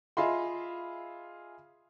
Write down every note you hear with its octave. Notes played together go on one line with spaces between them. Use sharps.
F4 G#4 D#5 E5 B5 C6